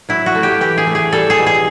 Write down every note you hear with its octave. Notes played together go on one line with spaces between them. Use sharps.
F#3 E4
F#4
A3
G4
E3 G4
G#4
A3
G#4
G3 A4
G#4
B2
G#4